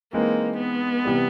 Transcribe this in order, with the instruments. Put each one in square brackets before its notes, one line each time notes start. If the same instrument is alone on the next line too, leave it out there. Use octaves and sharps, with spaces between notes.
[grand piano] E3 G#3 C4 D#4 [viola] A#3
[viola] B3
[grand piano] C3 E3 G3